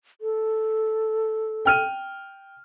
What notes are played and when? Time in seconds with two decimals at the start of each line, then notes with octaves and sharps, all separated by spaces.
0.21 A4
1.65 G5 F6 D#7